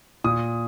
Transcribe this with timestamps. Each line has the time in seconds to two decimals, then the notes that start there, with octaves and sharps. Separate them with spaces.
0.24 A#2 D#6